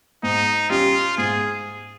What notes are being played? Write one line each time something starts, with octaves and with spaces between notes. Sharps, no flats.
G#2 D#4
G3 C#4 F4 G4
G#2 G#4